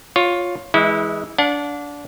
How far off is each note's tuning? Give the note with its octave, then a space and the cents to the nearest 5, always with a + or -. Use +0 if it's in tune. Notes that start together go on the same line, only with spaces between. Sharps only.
F4 +10 C#5 +0
E3 -10 G#3 +0 E4 -30
D4 -20 F#5 -45